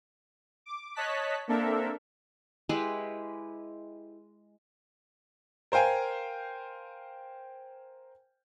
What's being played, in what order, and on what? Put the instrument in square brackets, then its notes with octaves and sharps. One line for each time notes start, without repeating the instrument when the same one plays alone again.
[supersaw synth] D6
C#5 D#5 A5 F#6 B6
A#3 C4 D4 A4 A#4 E5
[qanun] G#3 E4 G4 B4
[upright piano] A#4 C5 F5 G5 G#5